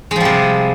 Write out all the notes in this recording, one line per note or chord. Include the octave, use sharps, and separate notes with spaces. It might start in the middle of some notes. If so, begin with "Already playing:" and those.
C3 F3 G3 G#3